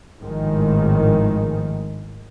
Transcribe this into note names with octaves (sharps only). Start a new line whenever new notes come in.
G#1 A2 D#3 F3 G#3